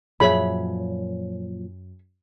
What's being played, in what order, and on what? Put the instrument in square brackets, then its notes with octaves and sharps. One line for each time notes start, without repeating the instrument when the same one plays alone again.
[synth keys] F#2 [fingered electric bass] A#2 F3 F#3 [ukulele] G#4 C#5 E5 [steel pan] B5